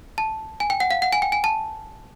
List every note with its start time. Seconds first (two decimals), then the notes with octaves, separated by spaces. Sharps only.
0.18 A5
0.60 G#5
0.70 G5
0.80 F#5
0.91 F5
1.02 F#5
1.13 G#5
1.22 G5
1.32 G#5
1.44 A5